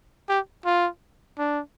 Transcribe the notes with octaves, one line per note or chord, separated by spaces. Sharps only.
G4
F4
D4